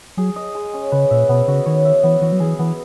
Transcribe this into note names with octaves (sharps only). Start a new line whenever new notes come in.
F#3 G#4
D#5
G#3
C#4
C#3 B4
A#2 E5
B2 B3
C#3 F#4
D#3 C#5
E5
E3 B3
E3 F#4
F#3
E3 G#4
E3 B3